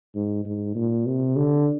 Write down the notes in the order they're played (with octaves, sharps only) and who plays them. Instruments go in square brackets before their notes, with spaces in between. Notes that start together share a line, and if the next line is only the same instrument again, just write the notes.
[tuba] G#2
G#2
A#2
C3
D3